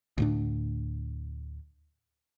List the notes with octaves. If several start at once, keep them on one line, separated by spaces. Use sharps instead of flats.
D2 A2 D4